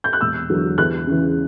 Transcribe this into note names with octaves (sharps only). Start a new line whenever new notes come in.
G6
F#6
E1 E6
E2 D3 F#3
E2 F#6
C#3 E3